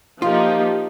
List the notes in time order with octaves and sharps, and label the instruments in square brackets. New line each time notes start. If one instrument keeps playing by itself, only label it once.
[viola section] F3 A#3 D#4 G4 [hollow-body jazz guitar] F4